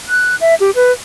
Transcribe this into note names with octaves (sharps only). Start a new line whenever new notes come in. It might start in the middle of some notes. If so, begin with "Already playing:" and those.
F#6
E5
G4
B4